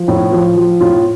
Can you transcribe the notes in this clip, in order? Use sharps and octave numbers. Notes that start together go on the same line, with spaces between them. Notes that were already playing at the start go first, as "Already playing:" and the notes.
Already playing: F3
A2
F3
F3
A2 F4